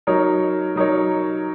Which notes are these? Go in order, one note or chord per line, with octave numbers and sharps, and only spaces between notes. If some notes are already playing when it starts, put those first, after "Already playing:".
F#3 D#4 A#4 C#5
F#3 D#4 A#4 C#5